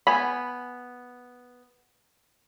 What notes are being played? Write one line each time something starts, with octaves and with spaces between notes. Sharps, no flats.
B3 G#5 B5